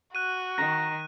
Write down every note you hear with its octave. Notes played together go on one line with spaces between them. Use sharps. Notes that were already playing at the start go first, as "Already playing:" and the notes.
F#4 F#6 D#7
D#3 A#5 A#6